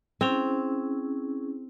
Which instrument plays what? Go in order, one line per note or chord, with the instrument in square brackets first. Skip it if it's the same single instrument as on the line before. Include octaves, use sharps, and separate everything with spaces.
[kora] C4 [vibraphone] C#4 E4 G#4